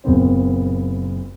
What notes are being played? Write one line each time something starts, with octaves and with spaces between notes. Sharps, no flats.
F#1 A#2 B3 C4 C5